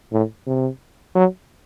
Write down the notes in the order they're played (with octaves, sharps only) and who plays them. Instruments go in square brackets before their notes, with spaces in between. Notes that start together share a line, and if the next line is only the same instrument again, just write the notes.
[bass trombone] A2
C3
F#3